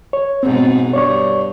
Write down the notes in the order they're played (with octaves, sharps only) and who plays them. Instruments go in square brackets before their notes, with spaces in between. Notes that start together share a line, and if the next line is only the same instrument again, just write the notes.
[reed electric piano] C#5
[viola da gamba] G#2 B2 [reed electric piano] C4
[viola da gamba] G2 [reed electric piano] C#5 D5 C#6